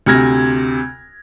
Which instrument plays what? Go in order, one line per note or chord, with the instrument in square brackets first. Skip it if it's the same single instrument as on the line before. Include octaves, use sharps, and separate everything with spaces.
[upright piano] D2 C3 F6 G#6 A#6